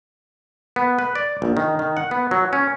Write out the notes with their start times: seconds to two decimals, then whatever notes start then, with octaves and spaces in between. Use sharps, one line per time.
0.76 B3
0.99 B4
1.15 D5
1.42 A#1
1.57 D#3
1.79 D#3
1.97 F#5
2.11 B3
2.31 F#3
2.53 C#4